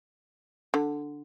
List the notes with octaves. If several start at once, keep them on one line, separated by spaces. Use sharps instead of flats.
D3